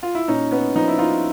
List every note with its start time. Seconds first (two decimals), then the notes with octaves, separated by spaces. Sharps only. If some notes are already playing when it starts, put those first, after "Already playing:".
0.03 F4
0.15 E4
0.28 A#2 C#4 D#4
0.51 B3 C#4
0.76 F3 D#4
0.88 E4
0.99 D#4 F4